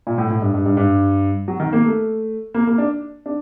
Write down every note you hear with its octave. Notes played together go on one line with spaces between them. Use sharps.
A#2
A2
A2
G2
G2
G2
G2
F#3
D#3
A#3
A3
A#3
A#3
D4
D4